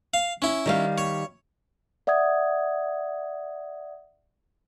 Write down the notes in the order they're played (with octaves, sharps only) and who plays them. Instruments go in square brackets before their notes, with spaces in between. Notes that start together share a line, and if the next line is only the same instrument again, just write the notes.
[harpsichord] F5
C#4 E4
[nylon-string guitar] D#3 G3 F5
[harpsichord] C#5
[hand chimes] D5 E5 F#5 D#6 G#6